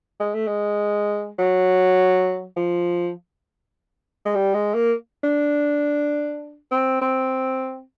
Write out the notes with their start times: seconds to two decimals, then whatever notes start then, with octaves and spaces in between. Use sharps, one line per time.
0.20 G#3
0.34 A3
0.47 G#3
1.39 F#3
2.56 F3
4.25 G#3
4.35 G3
4.54 G#3
4.75 A#3
5.24 D4
6.71 C4
7.02 C4